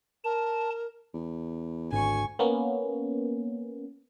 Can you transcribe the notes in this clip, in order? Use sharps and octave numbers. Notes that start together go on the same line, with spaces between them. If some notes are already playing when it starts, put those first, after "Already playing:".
A#4 A5
E2
G#1 D2 G#5 C#6
A#3 B3 C#4